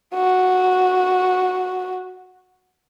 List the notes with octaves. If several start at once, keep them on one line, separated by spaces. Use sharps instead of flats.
F#4